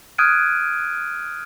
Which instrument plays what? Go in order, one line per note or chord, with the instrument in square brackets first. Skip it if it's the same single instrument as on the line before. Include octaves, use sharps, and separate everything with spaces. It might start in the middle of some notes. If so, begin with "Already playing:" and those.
[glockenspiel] D#6 F6 F#6 G#6 D7 D#7